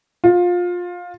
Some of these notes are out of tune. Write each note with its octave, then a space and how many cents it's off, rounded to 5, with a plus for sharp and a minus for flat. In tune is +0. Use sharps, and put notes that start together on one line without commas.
F4 +20